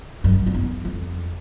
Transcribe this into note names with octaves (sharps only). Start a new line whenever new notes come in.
F#2
F2
E2
F2